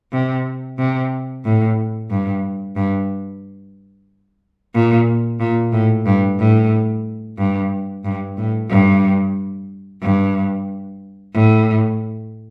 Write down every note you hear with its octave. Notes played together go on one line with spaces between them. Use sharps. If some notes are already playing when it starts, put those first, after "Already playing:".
C3
C3
A2
G2
G2
A#2
A#2
A2
G2
A2
G2
G2
A2
G2
G2
A2